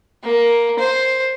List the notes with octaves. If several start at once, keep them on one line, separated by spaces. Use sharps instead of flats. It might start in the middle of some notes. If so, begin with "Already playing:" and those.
A#3
C5